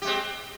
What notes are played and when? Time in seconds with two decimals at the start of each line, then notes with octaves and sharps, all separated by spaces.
0.02 G4
0.04 G#3
0.07 C4